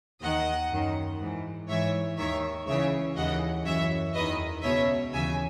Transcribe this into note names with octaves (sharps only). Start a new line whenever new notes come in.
D#2 D#3 D#5 F#5
F#2 D#3
G#2 E3
G#2 E3 C#5 E5
D#2 D#3 C#5 E5
C#2 C#3 E3 C#5 E5
D#2 C#3 E3 D#5 F#5
F#2 E3 C#5 E5
E2 D#3 B4 D#5
C#2 B2 C#5 E5
D#2 C#3 E3 E5 G#5